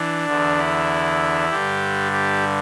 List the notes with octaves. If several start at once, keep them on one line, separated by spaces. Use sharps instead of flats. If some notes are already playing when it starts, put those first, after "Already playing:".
Already playing: E3 D4
E2 D3
E4
G2 D3 G4
G4